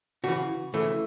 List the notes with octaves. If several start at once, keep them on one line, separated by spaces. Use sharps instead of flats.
C#3 E3 F#4
C#3 E3 A3